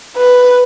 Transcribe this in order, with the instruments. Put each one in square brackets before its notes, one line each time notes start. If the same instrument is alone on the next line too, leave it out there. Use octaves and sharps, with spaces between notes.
[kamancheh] B4